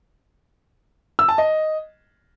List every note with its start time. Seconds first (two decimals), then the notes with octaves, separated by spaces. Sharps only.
1.19 E6
1.28 A5
1.38 D#5